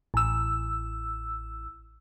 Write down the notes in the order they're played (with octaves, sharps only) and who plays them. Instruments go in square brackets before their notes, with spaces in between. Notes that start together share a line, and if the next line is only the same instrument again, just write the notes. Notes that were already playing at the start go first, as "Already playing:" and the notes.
[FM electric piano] A1 E6